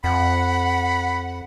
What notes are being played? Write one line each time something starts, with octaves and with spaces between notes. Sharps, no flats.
F2 F#5 B5